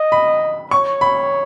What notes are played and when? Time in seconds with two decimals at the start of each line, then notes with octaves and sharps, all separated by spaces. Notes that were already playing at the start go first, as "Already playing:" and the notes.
Already playing: D#5
0.12 B5
0.71 C#5 C#6
1.01 B5